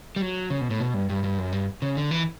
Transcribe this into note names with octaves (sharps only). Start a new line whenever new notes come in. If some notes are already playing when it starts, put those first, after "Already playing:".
G3
F#3
C#3
B2
A2
B2
G2
G2
G2
F#2
G2
C#3
D3
E3